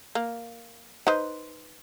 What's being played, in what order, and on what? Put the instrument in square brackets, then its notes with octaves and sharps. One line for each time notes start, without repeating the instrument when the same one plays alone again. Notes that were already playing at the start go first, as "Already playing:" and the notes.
[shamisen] A#3
D#4 B4 C5